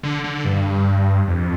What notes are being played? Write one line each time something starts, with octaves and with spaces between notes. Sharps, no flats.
D3
D3
G2
F2